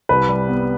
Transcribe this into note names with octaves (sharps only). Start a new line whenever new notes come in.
C2 B4
G3
B3